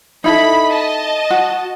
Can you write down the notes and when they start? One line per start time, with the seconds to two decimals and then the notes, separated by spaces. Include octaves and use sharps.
0.24 D#4 E4 A4 B5
0.67 D#5 A5
1.30 F#4